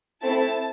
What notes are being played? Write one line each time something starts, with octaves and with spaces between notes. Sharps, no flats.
A3 C4 E4 A5